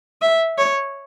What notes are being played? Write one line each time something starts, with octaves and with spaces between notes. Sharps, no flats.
E5
C#5